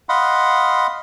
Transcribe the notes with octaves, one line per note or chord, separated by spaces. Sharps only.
D#5 F5 F#5 B5 C6